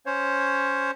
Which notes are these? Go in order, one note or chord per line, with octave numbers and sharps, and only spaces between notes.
C#4 C5 C#5